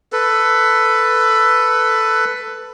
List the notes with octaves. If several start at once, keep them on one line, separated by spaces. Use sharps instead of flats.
A4 B4